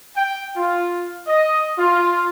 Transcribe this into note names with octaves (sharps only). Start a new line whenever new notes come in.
G5
F4
D#5
F4